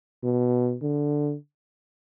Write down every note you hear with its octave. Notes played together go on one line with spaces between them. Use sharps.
B2
D3